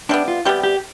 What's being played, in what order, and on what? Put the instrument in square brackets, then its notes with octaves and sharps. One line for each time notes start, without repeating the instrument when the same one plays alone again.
[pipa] C3 G3 B3 [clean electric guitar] D4
[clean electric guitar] F4
[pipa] C3 G3 B3 [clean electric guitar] G4
[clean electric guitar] G4